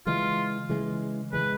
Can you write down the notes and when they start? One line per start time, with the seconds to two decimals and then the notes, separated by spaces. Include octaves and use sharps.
0.06 C#3 E3 G#3 F4
0.69 C#3 E3 G#3
1.33 C#3 E3 G#3 B4